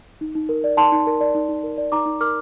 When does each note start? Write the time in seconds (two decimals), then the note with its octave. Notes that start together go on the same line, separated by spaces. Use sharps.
0.21 D#4
0.35 D#4
0.49 A#4
0.64 D5
0.77 D#4 A5 C6
0.92 D#4
1.07 A#4
1.21 D5
1.35 D#4
1.49 D#4
1.64 A#4
1.78 D5
1.92 D#4 A#5 D6
2.06 D#4
2.21 A#4 D6 F6